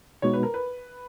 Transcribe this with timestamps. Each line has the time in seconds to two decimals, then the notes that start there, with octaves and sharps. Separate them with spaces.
0.22 B2 G#3 B3 D#4 F#4 C#5
0.34 B4
0.43 A#4
0.54 B4